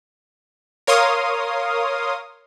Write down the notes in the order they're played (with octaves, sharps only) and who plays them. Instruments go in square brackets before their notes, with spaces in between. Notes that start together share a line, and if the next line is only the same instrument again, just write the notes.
[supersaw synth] A#4 C#5 F5 C6 D#6